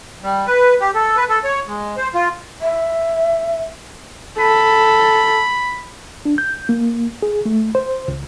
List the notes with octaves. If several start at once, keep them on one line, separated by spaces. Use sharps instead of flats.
G3
B4
G4
A4
B4
A4
C#5
G#3
C5
F4
E5
A4 B5
D4
G6
A#3
G#4
A3
C5
C#2